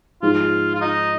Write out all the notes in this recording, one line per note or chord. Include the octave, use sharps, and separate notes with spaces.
G#2 F3 G#3 F4
F4
D#4